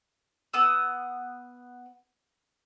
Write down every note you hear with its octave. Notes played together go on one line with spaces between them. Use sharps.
B3 D#6 E6